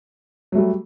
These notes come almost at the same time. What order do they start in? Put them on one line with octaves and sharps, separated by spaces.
F#3 A3 G3